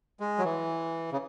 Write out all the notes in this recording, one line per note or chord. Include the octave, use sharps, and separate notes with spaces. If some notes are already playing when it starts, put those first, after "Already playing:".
G#3
F#3
E3
C#3